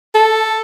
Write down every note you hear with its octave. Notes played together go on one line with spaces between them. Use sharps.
A4